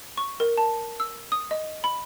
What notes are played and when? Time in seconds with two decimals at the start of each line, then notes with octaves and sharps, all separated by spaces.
0.17 C#6
0.40 A#4
0.57 A5
1.00 E6
1.32 D#6
1.51 D#5
1.84 B5